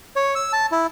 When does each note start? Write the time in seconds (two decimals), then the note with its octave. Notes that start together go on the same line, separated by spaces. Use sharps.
0.16 C#5
0.35 E6
0.53 A5
0.72 E4